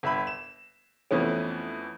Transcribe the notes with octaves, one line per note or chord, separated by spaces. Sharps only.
G1 E5 B5
E7
F2 E3 A3 B3 C#4